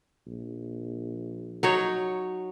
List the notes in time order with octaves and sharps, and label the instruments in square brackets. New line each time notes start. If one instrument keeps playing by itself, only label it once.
[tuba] A#1
[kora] F#3 D#4 C#5